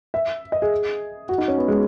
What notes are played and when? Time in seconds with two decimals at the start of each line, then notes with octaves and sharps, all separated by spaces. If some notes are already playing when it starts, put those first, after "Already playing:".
0.14 E5
0.52 D#5
0.62 G#4
1.29 F#4
1.38 D#4
1.48 C#4
1.58 B3
1.68 G#3